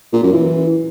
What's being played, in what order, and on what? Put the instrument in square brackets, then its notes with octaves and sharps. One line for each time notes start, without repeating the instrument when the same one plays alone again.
[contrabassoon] A#2
F#2
E3